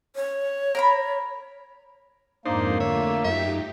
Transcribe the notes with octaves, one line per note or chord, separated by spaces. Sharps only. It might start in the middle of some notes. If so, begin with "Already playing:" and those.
C#5
A#4 A#5 B5
F2 G#2 A#3 D4 D#4 C5
D3 A3 F4 C#5 E5
F#2 D#4 G4 E5